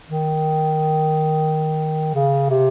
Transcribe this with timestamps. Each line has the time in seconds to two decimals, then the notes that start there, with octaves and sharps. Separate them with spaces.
0.09 D#3
2.15 C#3
2.50 C3